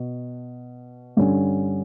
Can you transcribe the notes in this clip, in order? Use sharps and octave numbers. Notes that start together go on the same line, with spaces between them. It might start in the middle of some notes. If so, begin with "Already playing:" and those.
Already playing: B2
G2 D3 G3 C#4